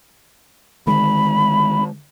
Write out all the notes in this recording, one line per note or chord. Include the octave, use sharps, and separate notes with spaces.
D3 D#3 G#3 B5